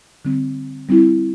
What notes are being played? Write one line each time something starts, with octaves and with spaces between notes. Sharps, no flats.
D3 G3 C4
G3 C4 E4